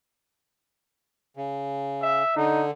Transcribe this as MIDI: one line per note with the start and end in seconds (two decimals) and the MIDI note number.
1.37 2.23 49
2.02 2.32 76
2.36 2.71 50
2.36 2.65 63